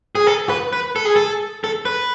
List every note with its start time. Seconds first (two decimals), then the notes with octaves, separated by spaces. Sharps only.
0.15 G#4
0.27 A4
0.49 B4
0.73 B4
0.96 A4
1.05 G#4
1.16 A4
1.64 A4
1.85 B4